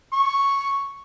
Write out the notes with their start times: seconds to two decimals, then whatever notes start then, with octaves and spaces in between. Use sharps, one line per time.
0.13 C#6